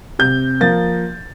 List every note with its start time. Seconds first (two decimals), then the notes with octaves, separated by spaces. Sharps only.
0.19 C3 G6
0.61 F3 A#3 A6